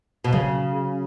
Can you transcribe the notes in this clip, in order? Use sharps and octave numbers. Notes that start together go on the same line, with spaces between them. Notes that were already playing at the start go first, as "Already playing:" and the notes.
B2
C#3 F#3